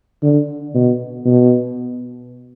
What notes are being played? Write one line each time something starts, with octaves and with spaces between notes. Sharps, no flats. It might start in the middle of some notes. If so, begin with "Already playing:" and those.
D3
B2
B2